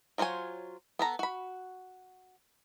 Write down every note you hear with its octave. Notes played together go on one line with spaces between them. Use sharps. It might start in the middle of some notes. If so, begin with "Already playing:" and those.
F#3 F4 C5 C#5 G#5
B3 A4 A#5
F#4 B5